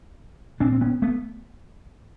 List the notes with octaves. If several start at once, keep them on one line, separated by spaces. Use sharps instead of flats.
A#2 C4 D4
C4
B3 C#4
A3 B3